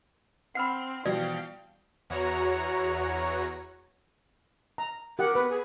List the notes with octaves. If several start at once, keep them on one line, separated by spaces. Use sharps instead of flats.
C4 F#5 B5 E6 F6 C7
B2 E3 F3 G3 F#4 D5 F5 G5
E2 F#4 C#5 A#5
A#5
G4 A#4 F#5
B3 B4
G#4